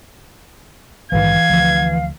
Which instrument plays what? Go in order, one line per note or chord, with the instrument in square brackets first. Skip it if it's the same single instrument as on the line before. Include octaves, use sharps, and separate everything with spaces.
[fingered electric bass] A#1 G#2 D#3 [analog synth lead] E3 [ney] F5 [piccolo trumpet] G#6
[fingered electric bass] D2 F3